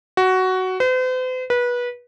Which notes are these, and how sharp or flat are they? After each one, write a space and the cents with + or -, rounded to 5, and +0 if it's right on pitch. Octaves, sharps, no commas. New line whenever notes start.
F#4 +10
C5 -45
B4 -25